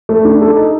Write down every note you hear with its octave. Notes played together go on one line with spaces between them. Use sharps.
A3
D4
A4
D#4